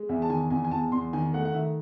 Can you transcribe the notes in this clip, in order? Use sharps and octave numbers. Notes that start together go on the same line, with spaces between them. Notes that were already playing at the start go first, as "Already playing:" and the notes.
Already playing: G#3
E2 E5
A5
D#3 G#5
E2 G#5
G#5
E2 A5
E2 C6
D#3 G#5
A3 F#5
F#5
D#3 E5